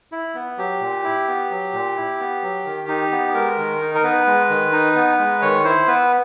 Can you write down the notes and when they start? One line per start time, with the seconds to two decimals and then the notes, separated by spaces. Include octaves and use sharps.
0.12 E4
0.35 B3
0.57 F#3 G4
0.81 A#2
1.04 E4
1.28 B3
1.51 F#3
1.73 A#2
1.97 E4
2.19 B3
2.42 F#3
2.65 D#3
2.88 D#4
3.12 B3
3.34 G#3 A#4
3.58 D#3
3.81 D#4
3.95 A#4
4.04 B3 B4
4.26 G#3
4.50 D#3
4.73 D#4
4.96 B3
5.19 G#3
5.42 D#3 C#5
5.65 E4 C5
5.88 B3 B4